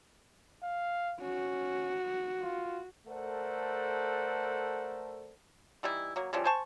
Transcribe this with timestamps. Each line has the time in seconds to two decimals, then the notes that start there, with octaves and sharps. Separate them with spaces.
0.63 F5
1.21 C#4 F#4
2.42 F4
3.08 A3 A4 A#4 C5 D5 F#5
5.83 E3 G3 D#4 E4
6.16 F#3 A#3
6.33 C#3 E3 F3 G3
6.45 C5 G#5 A5 C#6